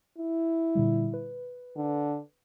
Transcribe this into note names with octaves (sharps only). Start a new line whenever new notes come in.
E4
A#2 D3 G3
B4
D3